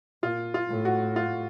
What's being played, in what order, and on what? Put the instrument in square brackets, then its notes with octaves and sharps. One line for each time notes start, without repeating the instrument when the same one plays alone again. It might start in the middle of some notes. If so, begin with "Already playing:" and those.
[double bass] A#2 [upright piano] F4
[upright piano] F4
[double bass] A2
[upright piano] F#4
F4